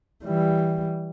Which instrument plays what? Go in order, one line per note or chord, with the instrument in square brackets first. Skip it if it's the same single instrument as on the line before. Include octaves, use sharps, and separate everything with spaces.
[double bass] E3 G3